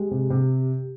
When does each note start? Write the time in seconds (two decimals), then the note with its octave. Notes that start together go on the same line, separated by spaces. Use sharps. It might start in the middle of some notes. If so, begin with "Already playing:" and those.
Already playing: G#3 G4
0.11 C3
0.30 C3